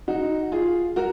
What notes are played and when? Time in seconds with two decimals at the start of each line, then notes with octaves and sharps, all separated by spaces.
0.08 D#4 F#4
0.52 F4 G#4
0.96 F#4 A#4